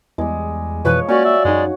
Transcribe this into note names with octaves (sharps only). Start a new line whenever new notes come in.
E2 G3 G#3
F2 B2 E3 F3 B4 C#5
A#3 C#4 F#4 D5
E5
F#2 G#3 D#4